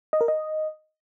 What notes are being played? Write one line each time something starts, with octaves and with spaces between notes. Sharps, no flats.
D#5
A#4
D#5